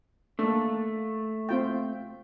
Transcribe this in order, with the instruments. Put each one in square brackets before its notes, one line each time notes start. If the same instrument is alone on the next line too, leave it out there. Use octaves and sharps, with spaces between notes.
[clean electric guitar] A3 [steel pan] A#3 D4
[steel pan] C4 F4 G5